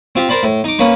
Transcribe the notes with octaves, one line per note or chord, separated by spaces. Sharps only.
C4 F4 G4
A#4 C5 D5 B5
A2
D#4 D6
A#3 C#4 B4